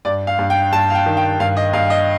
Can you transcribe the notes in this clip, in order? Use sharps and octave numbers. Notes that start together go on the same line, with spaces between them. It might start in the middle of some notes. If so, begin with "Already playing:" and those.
G2 D5
F5
G2
G5
G2 A5
F5
G5
D#3
G5
G2 F5
D#5
G2 F5
D#5